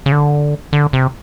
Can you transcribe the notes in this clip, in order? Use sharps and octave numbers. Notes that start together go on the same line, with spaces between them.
C#3
D3
D3
C3